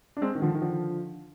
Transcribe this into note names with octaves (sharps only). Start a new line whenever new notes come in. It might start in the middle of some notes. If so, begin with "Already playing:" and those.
D4
G#3 C4
D#3
D3 F3
D#3
D3 F3